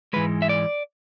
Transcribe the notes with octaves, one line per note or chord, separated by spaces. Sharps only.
G#2 E3 G#3 B4
E5
D5